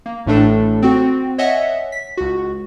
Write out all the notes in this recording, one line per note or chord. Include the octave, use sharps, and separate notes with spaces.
A#3
A1 A2 A3 D4 A4
C4 F#4
C#5 D#5 E5 F#5 G#5
B6
C#2 F#4